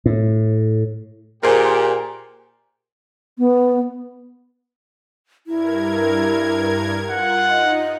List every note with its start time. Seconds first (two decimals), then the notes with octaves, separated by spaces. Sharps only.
0.06 A2
1.43 A#2 G4 G#4 A#4 C5
3.38 B3
5.47 G2 E4 A#4 G#6
7.08 F4 F#5 F#6
7.49 D#4 D#5